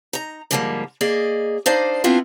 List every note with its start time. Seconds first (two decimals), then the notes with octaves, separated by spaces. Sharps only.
0.13 D#4 A#5
0.51 G#2 D3 F3 G3 A3 A#3
1.01 A#3 G#4 D5 D#5
1.66 D4 D#4 C5 D5 F5
2.04 B3 C4 D4 E4 F4